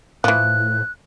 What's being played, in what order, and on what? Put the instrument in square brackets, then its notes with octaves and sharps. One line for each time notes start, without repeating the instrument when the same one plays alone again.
[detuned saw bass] A2 [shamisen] E3 F3 [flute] F#6